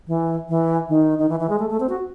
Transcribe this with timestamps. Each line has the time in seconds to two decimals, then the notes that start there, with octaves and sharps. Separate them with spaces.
0.08 E3
0.49 E3
0.89 D#3
1.19 D#3
1.29 E3
1.40 E3
1.49 G#3
1.59 A3
1.70 A3
1.80 C4
1.89 F#4